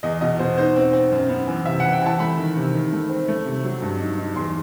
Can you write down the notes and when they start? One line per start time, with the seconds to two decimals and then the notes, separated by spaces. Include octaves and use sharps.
0.03 E2 D#5
0.21 B2 D#5
0.39 B2 C5
0.58 D#4 C5
0.76 C4
0.93 C4
1.12 F#2
1.29 B3
1.47 E3
1.65 C3 E5
1.80 E3 F#5
1.93 G5
2.01 E3 A5
2.20 A3 B5
2.37 D#3
2.56 C3
2.73 D#3
2.93 A3
3.09 C4
3.28 A3
3.45 C3
3.64 F#3
3.82 G2
4.00 D#4
4.18 D#4
4.36 E2 C6